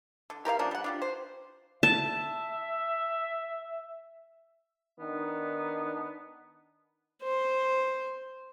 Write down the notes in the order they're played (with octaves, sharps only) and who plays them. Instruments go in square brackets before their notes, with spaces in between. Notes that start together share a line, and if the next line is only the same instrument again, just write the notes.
[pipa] D3
G4 A#4 B4 F5
F3 A#3 C#4 D4
G3 F#5
D4 F4 G4
C5
[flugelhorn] E5 [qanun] A5
[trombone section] D#3 D4 D#4 [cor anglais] B3
[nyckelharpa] C5